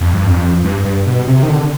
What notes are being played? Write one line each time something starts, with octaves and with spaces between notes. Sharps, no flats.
F2
G2
F2
G2
G2
B2
C3
D#3
D3